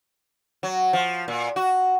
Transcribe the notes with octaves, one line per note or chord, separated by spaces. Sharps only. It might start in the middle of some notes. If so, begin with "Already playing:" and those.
F#3
F3
A#2
F#4